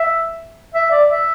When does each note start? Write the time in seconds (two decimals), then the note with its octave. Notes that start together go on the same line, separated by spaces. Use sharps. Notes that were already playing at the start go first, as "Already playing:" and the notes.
Already playing: E5
0.74 E5
0.91 D5
1.09 E5